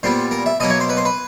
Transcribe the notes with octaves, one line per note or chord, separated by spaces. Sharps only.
A#2 G3 B3 C5
A#4
E5
B2 F#3 A#3 D#5
C#5
C5
B4
C5
B4